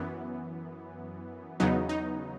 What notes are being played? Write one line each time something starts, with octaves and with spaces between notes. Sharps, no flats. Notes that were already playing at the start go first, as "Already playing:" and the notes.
Already playing: F#2 E3 B3
E2 C#3 F#3 B3 D#4
D#4